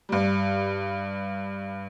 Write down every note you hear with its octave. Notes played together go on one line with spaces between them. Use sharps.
G2 G3